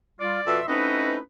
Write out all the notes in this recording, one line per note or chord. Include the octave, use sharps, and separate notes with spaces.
G3 F4 D5
F2 B2 E5 C6 E6
A3 C4 C#4 D#4 E4 F#4 B4